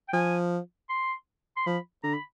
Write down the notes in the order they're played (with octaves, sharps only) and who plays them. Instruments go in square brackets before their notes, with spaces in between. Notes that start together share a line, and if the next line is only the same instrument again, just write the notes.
[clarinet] G5
[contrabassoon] F3 [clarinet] G#5
[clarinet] C6
C6
[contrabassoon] F3 [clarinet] B5
[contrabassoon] D3 [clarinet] A#5
[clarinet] B5